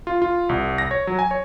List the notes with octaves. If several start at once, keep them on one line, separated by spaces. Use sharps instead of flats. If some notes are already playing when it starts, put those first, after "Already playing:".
F4
F4
C2
A#6
C#5
F#3
G#5
C#5